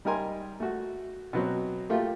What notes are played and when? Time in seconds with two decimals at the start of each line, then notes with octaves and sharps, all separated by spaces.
0.05 G3 D#4 A#4 G#5 C6
0.60 A3 F#4
1.33 B2 F#3 C4
1.90 A3 A#3 F4 G4